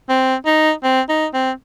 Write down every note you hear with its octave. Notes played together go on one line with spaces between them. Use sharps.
C4
D#4
C4
D#4
C4